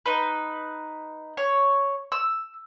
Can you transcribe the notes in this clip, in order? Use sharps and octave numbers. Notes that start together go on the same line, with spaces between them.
D#4 B4
C#5
E6